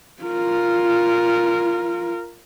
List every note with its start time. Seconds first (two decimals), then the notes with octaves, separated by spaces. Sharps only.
0.23 F4 A#4